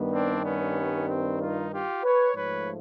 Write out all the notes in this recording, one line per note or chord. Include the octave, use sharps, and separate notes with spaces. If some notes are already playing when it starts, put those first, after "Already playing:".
Already playing: G2 D#3 G3 B3
C4 D4
B3 C#4
C4
D#4 F4
F4 G4
B4 C#5
G#2 F3 A3 B4 C#5